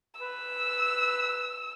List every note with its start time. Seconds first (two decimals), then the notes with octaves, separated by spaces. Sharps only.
0.21 B4 E6